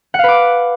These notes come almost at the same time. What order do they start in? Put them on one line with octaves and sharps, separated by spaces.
F#5 F5 B4 D6